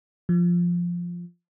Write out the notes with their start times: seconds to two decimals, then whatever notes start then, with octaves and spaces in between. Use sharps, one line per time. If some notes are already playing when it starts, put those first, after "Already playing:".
0.29 F3